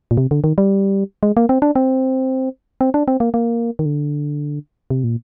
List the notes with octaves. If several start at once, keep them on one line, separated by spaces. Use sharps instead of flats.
A#2
C3
D3
D#3
G3
G#3
A#3
C4
D4
C4
C4
D4
C4
A#3
A#3
D#3
D3
C3
A#2